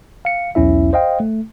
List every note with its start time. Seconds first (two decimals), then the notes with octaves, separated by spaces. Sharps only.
0.25 F5 C#7
0.55 B1 E2 C#4 E4 E5
0.93 C5 D#5 F5 G5
1.20 A3